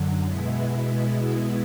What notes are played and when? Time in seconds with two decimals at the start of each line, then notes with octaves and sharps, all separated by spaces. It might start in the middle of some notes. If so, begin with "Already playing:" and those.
Already playing: F#2 D3 F#3
0.24 B2 G#3 B3 E4